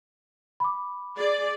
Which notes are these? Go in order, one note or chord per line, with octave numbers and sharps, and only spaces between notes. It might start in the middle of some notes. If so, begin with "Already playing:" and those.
B5 D6
G#4 D5